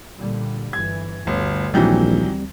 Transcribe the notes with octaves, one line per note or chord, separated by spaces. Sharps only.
A#2 D3 G3
G1 E3 G#6
G1 D2
A#1 D#3 E3 F#3 G3 C4